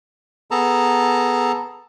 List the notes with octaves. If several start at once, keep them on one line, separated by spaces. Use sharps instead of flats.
B3 G#4 A4 A5 A#5